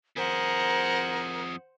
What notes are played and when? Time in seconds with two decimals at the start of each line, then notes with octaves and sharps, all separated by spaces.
0.16 F2 G#4 A#4 C5 F#5